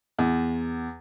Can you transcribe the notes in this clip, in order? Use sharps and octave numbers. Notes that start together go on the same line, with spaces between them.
E2